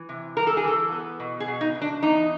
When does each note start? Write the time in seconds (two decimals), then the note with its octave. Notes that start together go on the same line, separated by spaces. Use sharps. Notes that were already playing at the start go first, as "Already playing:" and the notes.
Already playing: E3
0.09 C3
0.37 G3 A#4
0.47 A4
0.57 G#4
0.64 E3 A4
0.92 B3
1.20 B2
1.40 G#4
1.48 B2
1.61 D#4
1.75 B2
1.82 D4
2.02 E2 D#4